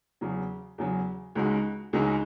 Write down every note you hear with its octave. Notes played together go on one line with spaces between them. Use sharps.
E2 C#3 F#3
E2 C#3 F#3
C#2 C#3 G#3 D#4 F#4
C#2 C#3 G#3 D#4 F#4